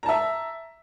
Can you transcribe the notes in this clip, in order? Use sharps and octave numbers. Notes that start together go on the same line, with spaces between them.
E5 A5 A#5